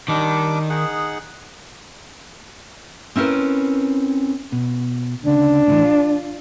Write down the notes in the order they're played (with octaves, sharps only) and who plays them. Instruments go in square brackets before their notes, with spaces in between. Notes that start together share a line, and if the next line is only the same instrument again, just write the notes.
[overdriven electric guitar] D#3 [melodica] G3 D4 D6
[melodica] D#4 G#4 F#5
[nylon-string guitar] C4 C#4 E4 F4 A#4 B4
[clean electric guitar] B2
[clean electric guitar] D2 C#3 [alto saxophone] D4
[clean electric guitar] A2 D#3 E3
F4